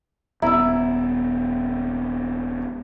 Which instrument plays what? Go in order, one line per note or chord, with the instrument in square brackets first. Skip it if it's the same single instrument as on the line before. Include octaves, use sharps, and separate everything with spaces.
[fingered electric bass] D#1 B3 [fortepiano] E4 [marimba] A#5 E6